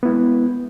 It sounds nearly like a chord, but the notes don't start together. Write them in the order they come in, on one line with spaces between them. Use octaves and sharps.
B3 E4 G#3